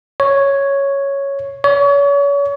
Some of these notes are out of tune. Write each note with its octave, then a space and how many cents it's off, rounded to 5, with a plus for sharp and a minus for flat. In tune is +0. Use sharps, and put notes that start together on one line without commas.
C#5 +0
C#5 +35